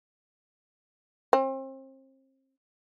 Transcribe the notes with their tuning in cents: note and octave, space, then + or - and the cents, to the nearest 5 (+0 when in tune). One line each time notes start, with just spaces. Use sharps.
C4 +35